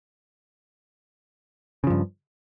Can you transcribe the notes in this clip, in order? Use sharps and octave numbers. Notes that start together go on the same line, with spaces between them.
G2 C#3 F3